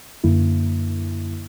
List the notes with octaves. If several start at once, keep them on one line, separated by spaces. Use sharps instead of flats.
F#2 D3 A#3 E4